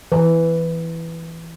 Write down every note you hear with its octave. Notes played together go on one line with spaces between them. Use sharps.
E3